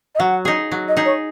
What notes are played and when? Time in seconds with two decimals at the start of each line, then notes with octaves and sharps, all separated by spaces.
0.15 D#5
0.19 F#3 F#5
0.45 D#4 G#4
0.72 F#3
0.88 D#5
0.97 D#4 G#4
1.05 C#5